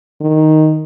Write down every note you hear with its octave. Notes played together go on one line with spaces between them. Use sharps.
D#3